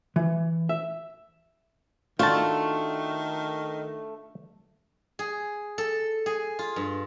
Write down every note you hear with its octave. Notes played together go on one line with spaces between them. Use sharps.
E3
E5
D#3 A3 D4 F4 F#4 A4 A5
G#4
A4
G#4
F4
G2